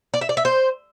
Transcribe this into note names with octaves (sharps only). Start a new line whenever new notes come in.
D5
E5
D5
E5
C5